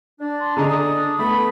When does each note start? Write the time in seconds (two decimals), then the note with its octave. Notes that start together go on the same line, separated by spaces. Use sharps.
0.21 D4
0.41 C6
0.57 D3 G#4 D#5 A#5
0.70 D#6
1.19 A3 B3 B5